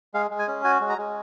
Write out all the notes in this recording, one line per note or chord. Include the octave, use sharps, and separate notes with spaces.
G#3 F5
G#3
G#5
C#4
F#4 G#5
G#3
A#5
G#3